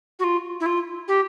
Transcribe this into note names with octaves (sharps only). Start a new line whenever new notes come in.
F#4
F4
E4
F4
G4